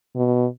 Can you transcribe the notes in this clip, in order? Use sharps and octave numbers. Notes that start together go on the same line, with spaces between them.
B2